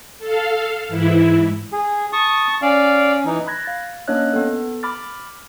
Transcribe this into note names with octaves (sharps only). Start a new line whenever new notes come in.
A4 F5
G#2 E3 E4
G#4
A5 C#6 D#6
C#4 D5 F5
E3 D#4
B5 F#6 G#6 A#6
F5 A6
A#3 C#4 D4 C#5 D#5 F#6
B3 A4
B5 D6 F6 A6